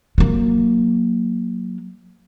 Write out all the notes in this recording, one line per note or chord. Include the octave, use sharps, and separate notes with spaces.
F#3 A#3